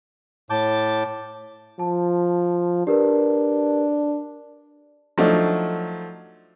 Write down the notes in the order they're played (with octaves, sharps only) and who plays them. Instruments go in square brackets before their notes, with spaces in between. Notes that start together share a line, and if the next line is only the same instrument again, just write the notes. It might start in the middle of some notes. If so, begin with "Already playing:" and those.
[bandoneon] A2 A5 D6 G6
[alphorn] F3 [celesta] A5
[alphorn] D4 [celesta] G4 A#4 B4
[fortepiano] F3 F#3 A3 D4 D#4